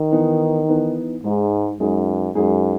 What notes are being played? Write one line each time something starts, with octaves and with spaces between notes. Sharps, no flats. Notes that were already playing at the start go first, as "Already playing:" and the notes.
Already playing: D#3
E3 B3 D#4
E3 B3 D#4
G#2 G#3 D#4 G#4
F#2 G#3 D#4 G#4
F#2 G#3 D#4 G#4